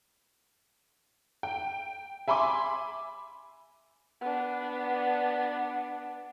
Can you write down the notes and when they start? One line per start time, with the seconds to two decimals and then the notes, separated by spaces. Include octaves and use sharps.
1.43 G5
2.28 E5 G#5 B5 C6 D6
4.21 B3 D4